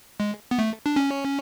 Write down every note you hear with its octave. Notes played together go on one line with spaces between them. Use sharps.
G#3
B3
A3
D4
C#4